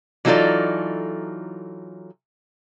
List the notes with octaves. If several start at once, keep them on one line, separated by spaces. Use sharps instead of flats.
E3 F#3 D#4 F4 A4 D5